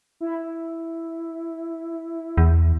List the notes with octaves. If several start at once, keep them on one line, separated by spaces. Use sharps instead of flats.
E4
E2